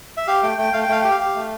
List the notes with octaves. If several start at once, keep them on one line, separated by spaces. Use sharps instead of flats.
E5
G4 F5
A3 G5
A3 G5
A3 F5
G5
A3 F5
G4 G5
F5
G4
A3